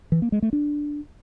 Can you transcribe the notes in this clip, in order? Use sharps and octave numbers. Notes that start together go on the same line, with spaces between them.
E3
A#3
G#3
A3
D4